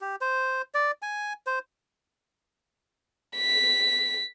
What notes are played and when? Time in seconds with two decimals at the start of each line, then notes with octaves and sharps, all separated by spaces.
0.01 G4
0.21 C5
0.74 D5
1.02 G#5
1.47 C5
3.37 B6